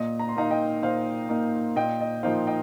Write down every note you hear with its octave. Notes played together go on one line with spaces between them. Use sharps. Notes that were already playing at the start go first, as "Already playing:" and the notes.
Already playing: A#2 D#5
A#5
C6
A#3 D#4 F5 A#5
D#5 G5
A#2 C5 F5
A#3 D#4
A#2 D#5 G5
D#5
F3 A#3 D#4 C5 F5
D#5 G5